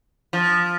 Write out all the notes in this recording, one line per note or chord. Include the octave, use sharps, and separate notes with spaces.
F3